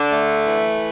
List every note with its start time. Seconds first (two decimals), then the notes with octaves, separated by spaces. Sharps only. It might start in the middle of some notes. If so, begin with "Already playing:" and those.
Already playing: D3 D4
0.11 A3
0.47 E3